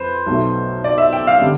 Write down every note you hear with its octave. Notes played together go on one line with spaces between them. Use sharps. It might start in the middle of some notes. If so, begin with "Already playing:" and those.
Already playing: F2 B4 C5
B1 B2 A3
D5
E5
G5
F5
D3 G3